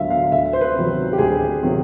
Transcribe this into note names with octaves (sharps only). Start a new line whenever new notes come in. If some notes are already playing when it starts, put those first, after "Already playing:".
Already playing: D2 D3 F#3 E5 F5
F5
D2 E5
C5
B4
C3 D#3 F#3
G4
D2 G#4
C3 D#3 F#3